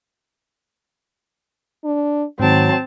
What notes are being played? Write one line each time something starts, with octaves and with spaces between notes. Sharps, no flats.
D4
G#2 D#3 F#3 C4 A5